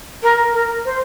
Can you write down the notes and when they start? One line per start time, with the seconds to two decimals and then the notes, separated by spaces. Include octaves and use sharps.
0.23 A#4
0.53 A#4
0.85 C5